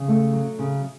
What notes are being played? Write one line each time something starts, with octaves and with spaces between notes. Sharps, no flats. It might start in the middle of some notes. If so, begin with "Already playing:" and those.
Already playing: C#3
A3
F#3
C#3